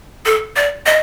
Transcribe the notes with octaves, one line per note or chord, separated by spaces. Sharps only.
A4
D5
D#5